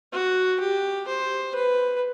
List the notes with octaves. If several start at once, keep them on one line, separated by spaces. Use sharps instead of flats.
F#4
G4
C5
B4